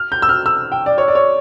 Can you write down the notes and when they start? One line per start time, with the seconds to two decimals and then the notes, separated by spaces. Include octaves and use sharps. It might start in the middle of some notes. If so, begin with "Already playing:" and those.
Already playing: F6
0.12 G6
0.22 E6
0.29 F6
0.46 E6
0.72 G5
0.86 D5
0.98 C#5
1.08 D5
1.15 C#5